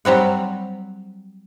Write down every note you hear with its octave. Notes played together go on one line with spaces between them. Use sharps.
F#3 G3 C4 F#5